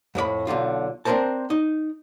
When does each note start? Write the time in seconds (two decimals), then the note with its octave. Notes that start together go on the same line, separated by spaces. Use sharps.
0.15 F2 A2 D5 B5
0.47 B1 B2 D3 F4
1.05 C4 D4 D#4 A#4 C5 A5
1.50 D#4